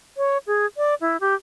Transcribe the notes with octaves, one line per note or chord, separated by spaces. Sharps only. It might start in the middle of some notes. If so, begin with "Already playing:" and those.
C#5
G#4
D5
E4
G4